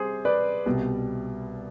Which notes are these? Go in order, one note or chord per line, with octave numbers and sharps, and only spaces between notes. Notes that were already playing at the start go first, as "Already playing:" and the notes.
Already playing: C3 G3 G#4 C5
B4 D5
C2 B2 G3